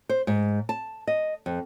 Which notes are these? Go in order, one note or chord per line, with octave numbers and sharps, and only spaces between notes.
C5
G#2
A5
D#5
F2